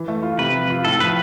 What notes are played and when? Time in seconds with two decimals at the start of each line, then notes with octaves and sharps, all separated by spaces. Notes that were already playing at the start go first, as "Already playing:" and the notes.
Already playing: E3
0.08 A3
0.23 F4
0.38 C3 B4
0.54 F3
0.70 F4
0.85 A2 A4
1.00 F3 B4